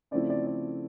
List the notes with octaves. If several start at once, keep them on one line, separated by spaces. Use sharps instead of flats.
C#3 F3 A3 C4 E4 D5
D5
D5